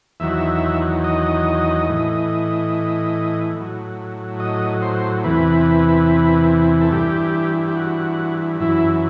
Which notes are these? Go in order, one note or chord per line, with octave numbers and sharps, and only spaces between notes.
E2 D#3 F#3 E5
D#5
A2 E3
A2 F#3
D#5
C5
E2 C3 E3 B4
A4
G2 E3 G4
G4
F#4
F#2 E3 E4